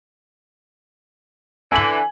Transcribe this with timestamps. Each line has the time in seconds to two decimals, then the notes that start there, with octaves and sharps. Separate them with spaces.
1.72 D3 E3 G#5 F#7